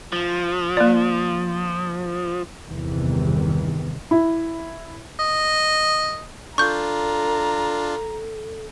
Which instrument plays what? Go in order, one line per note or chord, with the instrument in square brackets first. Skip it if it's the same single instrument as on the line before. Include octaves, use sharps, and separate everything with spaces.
[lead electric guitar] F3
[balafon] A#3 D5
[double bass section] G1 E2 C3 D#3 E3 G3
[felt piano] E4
[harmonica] D#5
[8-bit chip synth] D4 F4 [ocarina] A4 [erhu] A#5 [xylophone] C#6 G6